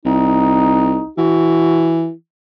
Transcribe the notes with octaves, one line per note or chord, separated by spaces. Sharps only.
C2 D#4
E3 F#4